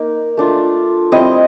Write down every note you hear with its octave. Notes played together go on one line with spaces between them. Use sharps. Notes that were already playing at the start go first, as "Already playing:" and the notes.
Already playing: A#3 D#4
A3 D4 F4
G3 C4 E4 D#5